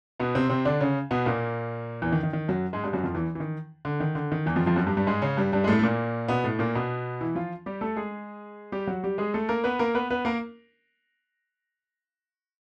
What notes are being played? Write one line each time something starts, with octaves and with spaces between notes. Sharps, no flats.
B2 B3
C3 C4
C3 C4
D3 D4
C#3 C#4
B2 B3
A#2 A#3
E2 E3
D#3
D#3
D#3
F#2 F#3
G#2 G#3
G2 G3
F#2 F#3
F2 F3
E2 E3
E3
D#3
D3
D#3
D3
D#3
E2 E3
F2 F3
F2 F3
F#2 F#3
G2 G3
G2 G3
G#2 G#3
C#3 C#4
G2 G3
G2 G3
G#3
A2 A3
A3
A#2 A#3
B2 B3
A2 A3
A#2 A#3
B2 B3
E3 E4
F3 F4
G3 G4
A3 A4
G#3 G#4
G3 G4
F#3 F#4
G3 G4
G#3 G#4
A3 A4
A#3 A#4
B3 B4
A#3 A#4
B3 B4
B3 B4
A#3 A#4